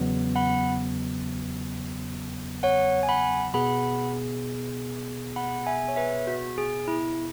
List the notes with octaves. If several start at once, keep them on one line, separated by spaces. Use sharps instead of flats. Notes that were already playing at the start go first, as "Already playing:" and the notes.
Already playing: E2 C#3 F#3 B3
F#5 B5
C#5 F#5
G#5
F#5 B5
B2 B3 G#4 F#5 B5
F#5 B5
E5 G#5
C#5
B4 E5
F#4
G#4
E4